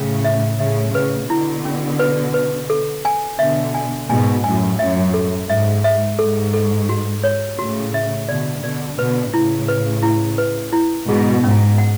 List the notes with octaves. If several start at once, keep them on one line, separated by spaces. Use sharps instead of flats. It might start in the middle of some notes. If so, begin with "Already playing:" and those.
Already playing: A2 C#3 C#4
E5
A2 C#3 E5
A2 C#3 B4
B2 D3 E4
C#4
B4
B4
A4
G#5
B2 D3 E5
G#5
G#2 B2 G#5
F#2 A2 G#5
F#2 E5
A4
G#2 E5
E5
G#2 A4
A4
F#4
C#5
A2 C#3 F#4
E5
B2 D3 D5
B2 D3 D5
B2 D3 B4
A2 C#3 E4
B4
E4
B4
E4
G#2 B2 G#4
G#2 C#4
F#5